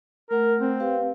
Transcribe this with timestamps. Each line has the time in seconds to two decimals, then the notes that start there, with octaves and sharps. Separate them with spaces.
0.31 A3 A#4 F#5
0.61 C4
0.80 G4 B4 F5